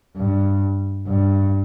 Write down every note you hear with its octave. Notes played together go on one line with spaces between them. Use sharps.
G2
G2